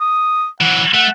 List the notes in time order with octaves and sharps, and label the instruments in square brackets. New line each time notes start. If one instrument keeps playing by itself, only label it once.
[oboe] D#6
[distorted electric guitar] E3 F#3 [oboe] F#5
[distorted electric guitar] A3 [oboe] F#5